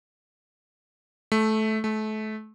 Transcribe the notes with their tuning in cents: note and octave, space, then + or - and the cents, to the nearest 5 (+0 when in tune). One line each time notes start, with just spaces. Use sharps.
A3 -15
A3 -30